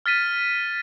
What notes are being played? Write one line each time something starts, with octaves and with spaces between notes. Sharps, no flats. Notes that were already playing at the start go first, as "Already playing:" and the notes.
F6 A6 B6 D#7